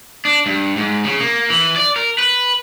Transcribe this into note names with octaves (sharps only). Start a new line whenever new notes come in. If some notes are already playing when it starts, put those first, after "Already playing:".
D4
G2
G#2
C#3
A#3
E3
D5
A#4
B4